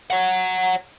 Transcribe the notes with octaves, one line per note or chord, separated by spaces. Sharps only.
C#5 F#5